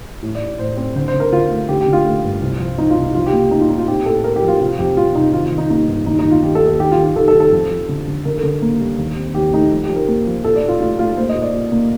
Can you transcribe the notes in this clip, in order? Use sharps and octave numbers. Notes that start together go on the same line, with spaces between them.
A2
D5
A2
A2 C5
C4
D3 C5
C5
D3
A#4
D3 F4
A3
D3 G4
G4
D3
F4
A3
G2
C2
F3
F3 D#4
F4
C2
D#4
F3 F4
G4
A#3
A#3 D#4
F4
A#2 D#4
F4
C4 G4
A2 A4
C4 A#4
G4
F3
F4
C3 F4
F2 G4
G3 F4
C3 D#4
D#3 F4
F4
D#3
D#4
A#3 D#4
G2
D#2 D#4
D#4
D#2
F4
D#3 G4
A4
D#2
A4
D#3 G4
F4
D#3
G4
D#3 A4
A4
D#3
A4
F2
F3
D3
D3
D3 A#4
A4
D3
A#3
G3
D#2
C4
D#2 G4
A3 D#4
F3
G4
F3
A#4
A#3
F3
A#2 A4
D5
A#2
F4
A3 F4
A3 F4
A#3 C5
D#5
A#2
D5
A#2
A#3